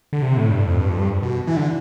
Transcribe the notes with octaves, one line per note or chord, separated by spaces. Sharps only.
D3
C3
A2
G2
F2
G2
F2
G2
B2
E3
D3